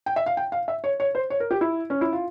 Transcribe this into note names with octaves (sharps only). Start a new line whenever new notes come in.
G5
E5
F5
G5
F5
E5
C#5
C#5
C5
C#5
A#4
G4
E4
C#4
E4
F4